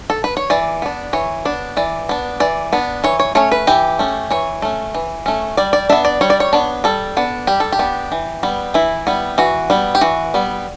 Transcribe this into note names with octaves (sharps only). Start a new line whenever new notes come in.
A4
B4
C#5
E3 D5
B3 D4
E3 C#5
B3 D4
E3 D5
B3 D4
E3 D5
B3 D4
E3 C#5
C#5
A3 C#4 C#5
B4
E3 G4
A3 C#4
E3 C#5
A3 C#4
E3
A3 C#4
G3 D5
D5
B3 D4 E5
D5
G3 C#5
D5
C#5
B3 D4
G3 A4
B3 D4
G3 G4
A4
G4
B3 D4
E3
G3 B3
E3 E4
G3 B3
E3 F#4
G3 B3
G4
E3 F#4
G3 B3